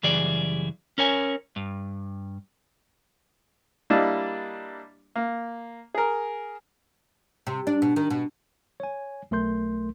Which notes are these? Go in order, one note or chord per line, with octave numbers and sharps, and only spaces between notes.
F#2 C#3 E3 G3 G#4 D5
C#4 A#4 C#5 G#5
G2
G3 A#3 D4 E4 D#5
A#3
G#4 A#4
C3
D4
B2
D#3
B2
C#5 G#5
B1 A3 A#4 C6 G6